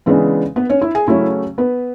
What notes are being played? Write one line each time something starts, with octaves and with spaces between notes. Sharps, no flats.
C#3 E3 G#3 B3 D4 B4
B3 B4
C#4 C#5
E4 E5
G#4 G#5
C#3 F#3 A3 C#4 E4 E5
B3 B4